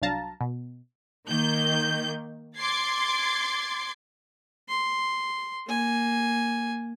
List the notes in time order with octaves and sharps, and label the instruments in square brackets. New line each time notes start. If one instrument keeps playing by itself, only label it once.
[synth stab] C2 F#3 D4 F5 A5 A#5
B2
[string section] D#3 A#3 G6
C6 D6 G#6 A6 C7
[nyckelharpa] C6
A#3 G#5